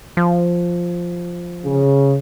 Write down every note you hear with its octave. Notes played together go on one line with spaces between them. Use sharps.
F3
C#3